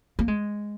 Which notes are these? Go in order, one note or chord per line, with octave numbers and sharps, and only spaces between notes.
A#3
G#3